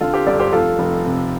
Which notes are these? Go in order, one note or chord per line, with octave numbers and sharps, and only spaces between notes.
D3 F4 A4
G4 C5
G1 A4 D5
G4 C5
F1 F4 A4
F1
C3